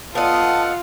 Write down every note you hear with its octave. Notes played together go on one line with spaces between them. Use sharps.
B3 F4 A4 D#5 F5 F#5 A5